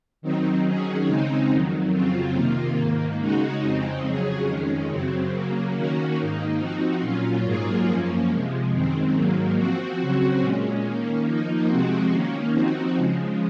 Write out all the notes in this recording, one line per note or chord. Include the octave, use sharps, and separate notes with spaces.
D#3 F#3 C4 D#4
D#3 F#3 C#4 G#4
C#3 G#3 C4 D#4
F2 D#3 F#3
F2 C#3 F#3 C4 F4
C3 D#3 A#3 F4
G#2 D#3 A#3
C#3 G#3 D#4 F#4
F2 C#3 G#3 C4 D#4
F2 C#3 F#3 C#4 G#4
F2 D#3 G#3 C#4
F#2 C#3 F#3 C4
C#3 F#3 A#3
D#3 A#3 C#4 F#4
G#2 D#3 A#3 D#4
F3 C4 D#4 F#4
A#2 F#3 C#4 F4
G#2 F#3 A#3 F4 G#4
F#2 F3 A#3 C#4
C3 F3 G#3
F#2 D#3 G#3 C4
G#2 D#3 F#3 A#3
F3 C4 F#4
C#3 F#3 C4 F#4
A#2 G#3 C#4
D#3 A#3 C#4
F3 A#3 D#4
C3 F3 G#3 C4 F#4
D#3 A#3 C#4
F3 C4 D#4 F#4
C#3 F3 G#3